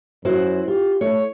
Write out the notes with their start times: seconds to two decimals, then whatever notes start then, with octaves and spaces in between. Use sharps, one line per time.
0.25 F#2 E4 F#4 C5
0.68 F4 G4
1.01 A3 C#5